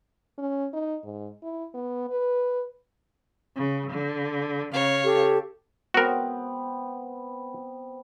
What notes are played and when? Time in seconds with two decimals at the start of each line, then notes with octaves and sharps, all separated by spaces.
0.38 C#4
0.73 D#4
1.04 G#2
1.43 E4
1.74 B3
2.10 B4
3.56 C#3
3.90 D3
4.71 C#3 C#5 F5
5.05 G4 A4
5.94 B3 C4 F#4 A#4